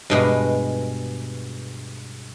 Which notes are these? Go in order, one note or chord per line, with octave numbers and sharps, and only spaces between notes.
G2 B2 G#3